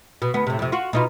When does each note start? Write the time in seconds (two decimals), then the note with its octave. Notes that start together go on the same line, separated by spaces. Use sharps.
0.22 B2
0.34 D2 B3
0.47 A2 C3
0.59 F2 C3
0.72 F4 F#4
0.93 B2 D#4 F4